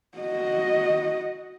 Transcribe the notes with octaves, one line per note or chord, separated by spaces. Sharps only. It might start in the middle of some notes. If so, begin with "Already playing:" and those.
F#4 D#5